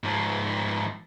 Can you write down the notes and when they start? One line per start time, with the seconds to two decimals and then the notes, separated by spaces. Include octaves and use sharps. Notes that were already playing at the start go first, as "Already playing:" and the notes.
0.04 G#2 F3